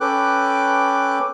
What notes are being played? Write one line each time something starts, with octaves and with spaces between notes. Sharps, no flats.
C#4 A4 B4 G5 D6 F#6